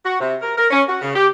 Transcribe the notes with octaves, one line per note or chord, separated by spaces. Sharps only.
F#4
C3
A#4
A#4
C#4
F#4
C#3
G4